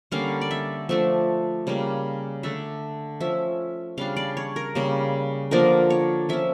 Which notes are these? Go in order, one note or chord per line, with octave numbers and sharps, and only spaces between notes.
D3 G3 A#3 C#4 F5
D5
E5
F3 A3 D4 E5
C#3 G3 A#3
D3 A3 D4 E5
F3 C#4 E5
C#3 G3 D4 F5
D5
C#5
A#4
C#3 G3 A#3
D3 F3 A#3 D4 A#4
C#5
F3 C#4 E5